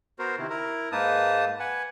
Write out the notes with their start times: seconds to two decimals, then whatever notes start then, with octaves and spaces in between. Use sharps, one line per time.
0.19 B3 F#4 A#4 C5
0.38 C3 D#3 E4
0.50 E4 A#4
0.92 G#2 A#3 D#4 B4 A5 D#6
1.60 B4 F#5 G#5